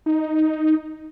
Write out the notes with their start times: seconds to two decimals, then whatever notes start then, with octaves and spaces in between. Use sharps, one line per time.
0.06 D#4